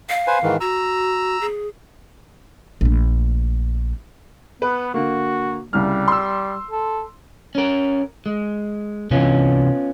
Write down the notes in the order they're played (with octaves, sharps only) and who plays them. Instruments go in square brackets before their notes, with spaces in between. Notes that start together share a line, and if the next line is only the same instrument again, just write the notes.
[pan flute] F5
[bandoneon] B4 C5 G#5
G#2 D#3 E3
[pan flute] F#4 [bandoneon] A#5 E6
[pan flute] G#4
[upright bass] A#1 A3
[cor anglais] B3 [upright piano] B4
[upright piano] D3 A#3 [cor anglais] F#4
[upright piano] C2 C#3 F6 [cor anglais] G3
[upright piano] C6 E6
[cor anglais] A4
[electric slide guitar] C#4 A#4
G#3
[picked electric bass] C3 E3 [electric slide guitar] B3 C#4 F4